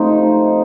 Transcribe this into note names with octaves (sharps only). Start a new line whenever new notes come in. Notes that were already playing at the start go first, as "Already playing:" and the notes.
Already playing: C3 F3 A3 C4 D#4